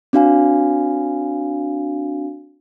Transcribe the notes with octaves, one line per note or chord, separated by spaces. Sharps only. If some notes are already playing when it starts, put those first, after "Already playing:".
C4 D4 F#4 F5 G#5